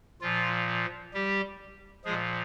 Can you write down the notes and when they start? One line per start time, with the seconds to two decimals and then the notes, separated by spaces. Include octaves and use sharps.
0.22 A#2 F3 F4
1.14 G3 G4
2.05 A#2 F3 G#3 G#4